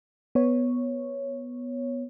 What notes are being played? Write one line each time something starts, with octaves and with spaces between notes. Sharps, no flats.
B3 C#5